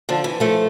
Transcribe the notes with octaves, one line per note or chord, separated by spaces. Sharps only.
D3 F3
E3
F3 A3